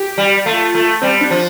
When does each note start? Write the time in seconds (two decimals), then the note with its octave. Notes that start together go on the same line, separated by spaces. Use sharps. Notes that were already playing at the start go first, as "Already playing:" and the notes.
Already playing: G4
0.18 G3
0.46 A3 F4
0.75 A3
1.01 G3 C4
1.21 D4
1.31 F3